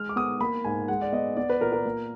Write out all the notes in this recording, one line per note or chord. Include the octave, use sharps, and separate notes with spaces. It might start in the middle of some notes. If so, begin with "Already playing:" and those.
Already playing: G#3 F6
D6
B3 D#6
A#3 B5
G#2 G#5
G#3 F#5
D5
B3 D#5
B3 D5
B4
A#2 A#4
A#4
A#3